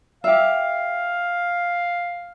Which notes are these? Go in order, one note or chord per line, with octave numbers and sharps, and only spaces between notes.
G4 E5 F5